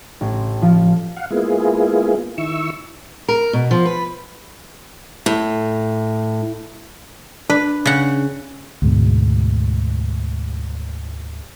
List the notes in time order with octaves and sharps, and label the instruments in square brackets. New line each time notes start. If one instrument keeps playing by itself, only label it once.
[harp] A1
F3
[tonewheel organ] F5 F#5
G#3 A#3 B3 E4 F4 G#4
D#3 E4 C#6 E6
[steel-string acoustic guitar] A#4
B2
F3
B4
A2
[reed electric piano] D4 [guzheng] B4
[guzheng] C#3 F#5
[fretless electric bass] D2 G#2 B2